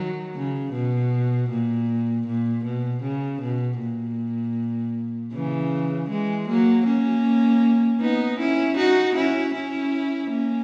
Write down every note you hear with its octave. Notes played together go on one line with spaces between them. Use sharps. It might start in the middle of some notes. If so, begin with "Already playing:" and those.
Already playing: D#3 F#3
C#3
B2
A#2
A#2
B2
C#3
B2
A#2
C#3 E3
E3 G#3
F#3 A#3
A#3 C#4
B3 D#4
C#4 E4
D#4 F#4
C#4 E4
C#4 E4
A#3 C#4